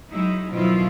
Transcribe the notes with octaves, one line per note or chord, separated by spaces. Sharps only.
F#3 G#3 D#4 E4
B2 D#3 F3 F#3 E4 F4